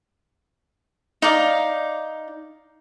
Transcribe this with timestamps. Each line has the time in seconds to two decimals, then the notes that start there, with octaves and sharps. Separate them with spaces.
1.22 D#4 D5 F5